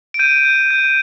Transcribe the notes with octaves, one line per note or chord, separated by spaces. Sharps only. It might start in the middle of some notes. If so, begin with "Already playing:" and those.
D7
G6 D#7
G6
G6